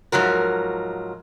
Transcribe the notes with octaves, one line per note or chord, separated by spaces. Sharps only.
G#2 F3 F#3 A#4